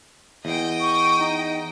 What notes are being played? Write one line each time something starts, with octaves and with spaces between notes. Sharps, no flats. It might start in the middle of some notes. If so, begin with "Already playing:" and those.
E2 D#5 G5
C#6
D#4